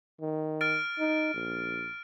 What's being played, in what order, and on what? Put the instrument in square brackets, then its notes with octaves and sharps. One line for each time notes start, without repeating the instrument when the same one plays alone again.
[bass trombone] D#3
[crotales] F6 A6 D7
[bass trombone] D#4
A#1